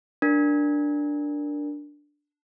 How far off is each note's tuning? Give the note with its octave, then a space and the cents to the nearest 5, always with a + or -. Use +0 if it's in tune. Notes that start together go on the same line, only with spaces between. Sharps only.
D4 +0 A#4 +0